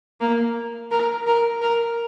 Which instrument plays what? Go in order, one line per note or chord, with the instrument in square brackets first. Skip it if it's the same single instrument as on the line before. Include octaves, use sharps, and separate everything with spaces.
[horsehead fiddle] A#3
A#4
A#4
A#4